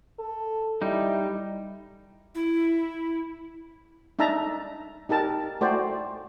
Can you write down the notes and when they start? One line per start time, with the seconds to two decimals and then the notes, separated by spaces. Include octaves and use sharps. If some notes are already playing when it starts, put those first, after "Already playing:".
0.19 A4
0.82 G3 D#4 E4
2.35 E4
4.19 D4 D#4 E5 A5 A#5
5.09 D#4 G4 A#4 A5
5.61 A3 F#4 C5 D5 G5